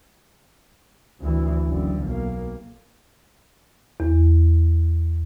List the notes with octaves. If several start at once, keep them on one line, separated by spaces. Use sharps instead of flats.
D2 E3
F#1 D3
B1 A#3
E2